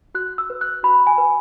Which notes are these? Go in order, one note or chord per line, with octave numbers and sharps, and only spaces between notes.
F#4 F#6
E6
B4
F#6
F#4 B5
G#5
B4